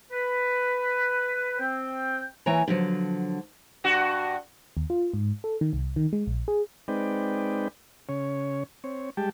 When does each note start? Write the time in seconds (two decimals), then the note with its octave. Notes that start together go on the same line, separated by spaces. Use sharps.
0.11 B4
1.58 C4 C5 G5
2.46 E3 A#3 C#5 G#5 A#5
2.68 D3 F3 F#3
3.84 G2 F#4
4.77 D#2
4.90 F4
5.13 G#2
5.44 A4
5.61 D#3
5.73 C2
5.96 D#3
6.13 G#3
6.27 A#1
6.48 G#4
6.88 G#3 C4 D#4 B4 D5 G5
8.09 C#3 C#5
8.84 C4 C#5
9.17 G3 G#3 G4 G5 A5